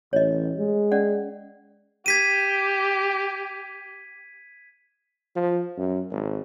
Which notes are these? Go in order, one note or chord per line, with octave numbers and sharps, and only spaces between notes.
A1 C#5 D#5
G#3
C#4 D5 F#5
G4 G#6 B6 D#7
F3
F#2
G#1